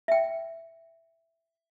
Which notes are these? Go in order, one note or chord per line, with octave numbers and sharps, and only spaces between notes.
E5 G5